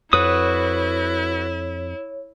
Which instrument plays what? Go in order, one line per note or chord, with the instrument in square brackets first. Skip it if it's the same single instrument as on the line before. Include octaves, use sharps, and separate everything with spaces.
[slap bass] F2 [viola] E4 [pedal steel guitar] F#4 B4 D#6 [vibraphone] C#5